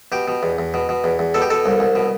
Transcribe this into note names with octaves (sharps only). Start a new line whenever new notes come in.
B2 G4
B2
E2
E2
B2
B2
E2
E2
B2 A4
G4
B2 A4
C2
C2
B2